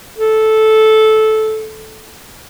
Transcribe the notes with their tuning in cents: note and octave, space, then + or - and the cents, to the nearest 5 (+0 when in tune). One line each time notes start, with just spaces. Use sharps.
A4 -10